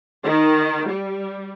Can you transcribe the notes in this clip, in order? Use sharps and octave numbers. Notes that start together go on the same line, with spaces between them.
D#3
G3